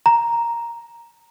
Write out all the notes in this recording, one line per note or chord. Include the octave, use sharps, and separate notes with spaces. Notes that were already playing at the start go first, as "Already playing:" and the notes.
A#5